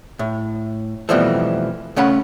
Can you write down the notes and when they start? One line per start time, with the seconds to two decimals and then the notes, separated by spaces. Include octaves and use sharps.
0.19 A2
1.09 F2 B2 E3 F3 G3 A3
1.96 C#3 A3 C#4 F#5 B5